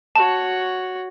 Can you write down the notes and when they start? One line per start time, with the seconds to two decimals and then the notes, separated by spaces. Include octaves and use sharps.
0.15 F#4 C#5 A5